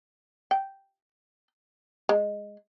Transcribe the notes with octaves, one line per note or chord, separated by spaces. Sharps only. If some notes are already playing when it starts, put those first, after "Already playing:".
G5
G#3